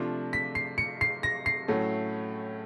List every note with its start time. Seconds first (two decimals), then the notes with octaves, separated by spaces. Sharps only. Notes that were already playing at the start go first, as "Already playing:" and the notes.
Already playing: C3 F3 A3 D4 F4
0.33 B6
0.55 C7
0.78 C#7
1.01 C7
1.23 A#6
1.46 C7
1.68 A2 F#3 A3 C#4